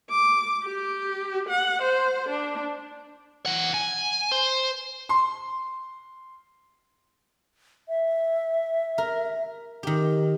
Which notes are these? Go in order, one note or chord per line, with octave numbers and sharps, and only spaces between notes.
D6
G4
F#5
C5
D4
E3 F#5
G#5
C5
C6
E5
A#4
D#3 G4